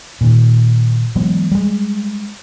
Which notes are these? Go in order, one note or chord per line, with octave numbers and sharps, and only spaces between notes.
A#2 D#3
E3 F#3 G#3 B3
G3 G#3